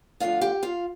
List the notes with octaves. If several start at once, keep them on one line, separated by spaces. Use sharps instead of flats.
D2 D3 F3 F4 F5
G4 G5
F4 F5